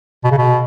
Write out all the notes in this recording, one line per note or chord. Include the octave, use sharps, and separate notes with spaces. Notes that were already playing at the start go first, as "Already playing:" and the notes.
B2
C#3
B2